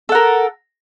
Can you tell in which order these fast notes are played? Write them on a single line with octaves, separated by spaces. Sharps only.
A4 F#5 A#4